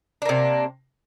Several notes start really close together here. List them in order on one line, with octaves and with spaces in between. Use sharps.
D4 A#3 C3